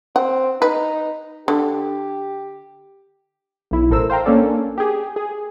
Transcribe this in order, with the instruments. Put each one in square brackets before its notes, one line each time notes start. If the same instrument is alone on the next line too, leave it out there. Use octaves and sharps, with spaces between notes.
[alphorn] C4 [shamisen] F#5
[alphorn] D#4 [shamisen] B4
[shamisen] D3 [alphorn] G4
[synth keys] B1 E4
A1 A4 A#4 C5 E6
C5 F5 G5 A#5
A#3 C#4 D4 A4 D5
G4 G#4
G#4